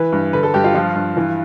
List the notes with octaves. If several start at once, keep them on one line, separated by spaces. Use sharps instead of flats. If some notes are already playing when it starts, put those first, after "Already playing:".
Already playing: E3 B4
G2
D3 B4
A4
G2 G4
F4
F3 F4
G2
E3